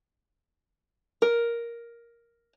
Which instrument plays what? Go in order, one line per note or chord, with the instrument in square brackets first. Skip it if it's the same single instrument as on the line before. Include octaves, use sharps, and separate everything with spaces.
[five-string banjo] A#4